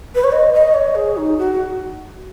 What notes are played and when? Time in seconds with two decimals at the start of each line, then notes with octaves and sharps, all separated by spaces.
0.15 B4
0.24 C#5
0.32 D#5
0.53 D#5
0.74 C#5
0.95 G#4
1.17 D#4
1.38 F#4